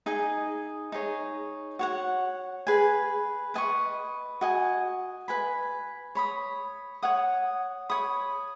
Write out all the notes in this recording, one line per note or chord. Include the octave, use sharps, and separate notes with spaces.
D#4 G#4 D#5 G#5
D#4 G#4 C#5
F#4 C#5 F#5
G#4 B4 G#5
B4 D#5 G#5 C#6
F#4 D#5 G#5
B4 G#5 B5
C#5 B5 D#6
C#5 F#5 D#6
C#5 B5 D#6